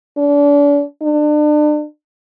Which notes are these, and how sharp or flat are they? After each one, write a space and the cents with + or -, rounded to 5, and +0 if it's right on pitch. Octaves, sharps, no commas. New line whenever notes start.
D4 -35
D4 +35